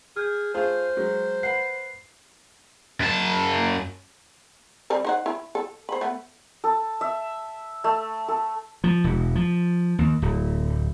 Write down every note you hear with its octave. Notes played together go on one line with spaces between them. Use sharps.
G#4 F6 G6
A3 F4 G#4 C5
F#3 G#3
B4 F#5 C7
F#2 A5
G3 C4 G4
D#4 C5 F#5
E4
A4
C5 B5
A3 B3
A4
E5
A3
A4
F3
E1
F3
D#2
D1